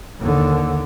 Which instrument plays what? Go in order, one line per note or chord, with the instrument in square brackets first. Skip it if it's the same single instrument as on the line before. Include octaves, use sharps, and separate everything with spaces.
[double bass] D#2 D3